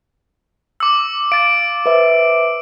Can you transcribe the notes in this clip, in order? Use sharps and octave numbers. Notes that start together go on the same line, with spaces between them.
D6 E6
F5 A6 D7
B4 C5 E5